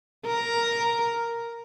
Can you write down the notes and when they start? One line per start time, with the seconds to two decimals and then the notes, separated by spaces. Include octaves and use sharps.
0.27 A#4